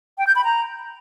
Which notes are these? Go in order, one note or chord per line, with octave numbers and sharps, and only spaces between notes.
G5
G6
B5
A#5